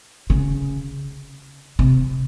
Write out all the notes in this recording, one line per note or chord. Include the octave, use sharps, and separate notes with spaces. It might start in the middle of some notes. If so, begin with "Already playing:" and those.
C#3
C3